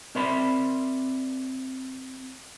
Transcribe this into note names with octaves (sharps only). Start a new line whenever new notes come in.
C4 A#4 D5 E5 B5 C6